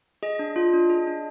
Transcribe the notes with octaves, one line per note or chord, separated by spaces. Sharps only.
G#4 D#5
D4
F4
D4
G#4
D4